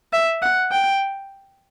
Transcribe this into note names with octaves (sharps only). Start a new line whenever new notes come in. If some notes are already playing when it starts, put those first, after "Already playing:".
E5
F#5
G5